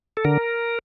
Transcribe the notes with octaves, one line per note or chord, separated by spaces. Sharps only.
A4
D3 A#4